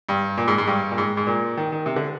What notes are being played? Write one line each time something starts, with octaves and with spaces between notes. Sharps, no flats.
G2
A#2
G#2
G#2
G2
A#2
G#2
G#2
A#2
D#3
D#3
C3
D3